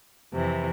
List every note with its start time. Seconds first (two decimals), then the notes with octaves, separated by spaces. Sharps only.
0.32 F2 C3 E3